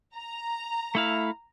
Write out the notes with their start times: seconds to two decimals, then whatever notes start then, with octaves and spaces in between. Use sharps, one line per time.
0.15 A#5
0.95 A3 E4 F5